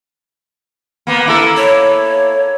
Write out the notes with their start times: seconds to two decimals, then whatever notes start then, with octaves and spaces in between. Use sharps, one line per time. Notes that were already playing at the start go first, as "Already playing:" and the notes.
1.07 A#3 B3
1.26 A#3 E4 A4
1.57 C#5